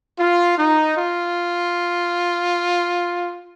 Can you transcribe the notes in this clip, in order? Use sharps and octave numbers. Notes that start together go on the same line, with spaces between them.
F4
D#4
F4